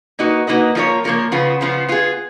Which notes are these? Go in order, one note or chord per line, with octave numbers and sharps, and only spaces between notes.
A#3 D#4 F#4 B4 D#5
A#3 D#4 F#4 B4 D#5
F3 A#3 F4 A#4 C#5
F3 A#3 F4 A#4 C#5
C#3 F3 B3 F4
C#3 F3 B3 F4
B3 F4 G#4